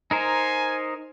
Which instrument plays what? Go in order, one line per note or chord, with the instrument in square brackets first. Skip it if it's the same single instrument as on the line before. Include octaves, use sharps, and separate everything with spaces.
[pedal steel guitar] D#4 A#4 C5 [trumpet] G#5